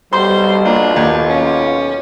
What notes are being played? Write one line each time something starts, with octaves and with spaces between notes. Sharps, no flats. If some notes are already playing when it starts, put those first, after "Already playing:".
B1 G3 C5 C6
A#3 D4 F4
D#2
C#4